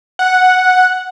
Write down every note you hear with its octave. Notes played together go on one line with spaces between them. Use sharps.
F#5